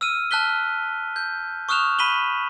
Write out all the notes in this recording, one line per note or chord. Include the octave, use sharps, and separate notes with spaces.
E6 F6 D#7
A5 F6 F#6 B6 G7
G6
C#6 D#6 F6 F#6 E7 F7
B5 B6 D#7 E7 F#7 G7